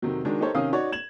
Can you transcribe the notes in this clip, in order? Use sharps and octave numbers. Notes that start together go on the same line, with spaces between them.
F2 C3 D#3 F#3
D#3 F#3 G#3 D4
D#4 G4 A4 A#4 C5 C#5
C3 D#3 C#4 F5 D#6
D#4 F#4 C#5 D5
G#6 E7 F#7